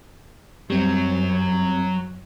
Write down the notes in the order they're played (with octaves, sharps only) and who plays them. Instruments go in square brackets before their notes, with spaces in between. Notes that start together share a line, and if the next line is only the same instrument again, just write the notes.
[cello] F#2 [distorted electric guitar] F#3 [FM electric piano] G3 C4